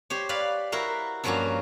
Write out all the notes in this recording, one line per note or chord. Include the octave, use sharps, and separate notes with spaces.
G4 C5 C#5
B4 D5 F5 B5
E4 F#4 A#4 C5
G2 F3 F#3 A#3 C#4 F#4